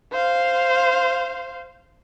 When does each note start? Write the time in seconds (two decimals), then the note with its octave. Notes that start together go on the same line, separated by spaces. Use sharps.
0.12 C5 F5